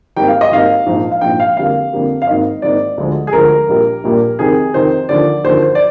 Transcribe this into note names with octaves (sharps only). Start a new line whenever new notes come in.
G#1 G#2 G3 A#3 G5
F5
D#5
G#1 G#2 G3 A#3 F5
A#1 G#2 F3
F5
A#1 G#2 F3 G5
F5
F2 D3 G3 A#3 F5
F2 D3 G3 A#3
F5
G#1 G#2 D#3 A#3 D#5
G#1 G#2 D#3 A#3 D5
D2 D3 F3 G#3
G#4
D2 D3 F3 G#3 A#4
A#1 A#2 G3 A#3
A#1 A#2 G3 A#3
F2 C3 D#3 G#4
F2 C3 D#3 C5
D#2 D3 F3 D5
D#2 D3 F3 C5
C5
D5